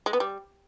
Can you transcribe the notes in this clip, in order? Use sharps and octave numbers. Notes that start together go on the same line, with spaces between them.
G#3
B3
G3